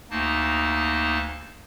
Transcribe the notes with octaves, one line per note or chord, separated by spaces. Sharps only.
D2 A#3 D#4 A5